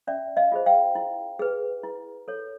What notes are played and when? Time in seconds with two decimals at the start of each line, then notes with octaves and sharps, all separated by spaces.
0.07 C#4 D5 E5
0.37 D#5 F5
0.52 F4 G#4 C5
0.66 F5 G5
0.95 E4
1.39 G#4 B4
1.83 E4
2.28 A4 C#5